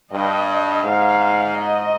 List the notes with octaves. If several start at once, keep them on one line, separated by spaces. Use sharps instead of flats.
G2 D#5
G#2 F5
D#5